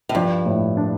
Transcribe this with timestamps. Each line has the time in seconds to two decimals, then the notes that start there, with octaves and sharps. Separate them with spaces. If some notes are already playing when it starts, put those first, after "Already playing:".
0.09 A2
0.15 G2 F3
0.46 A2
0.77 D4